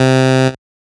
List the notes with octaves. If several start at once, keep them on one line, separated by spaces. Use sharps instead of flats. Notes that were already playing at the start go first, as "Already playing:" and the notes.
Already playing: C3